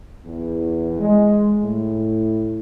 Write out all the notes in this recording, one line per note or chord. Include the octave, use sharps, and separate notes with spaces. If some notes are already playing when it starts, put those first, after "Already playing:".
E2
G#3
A2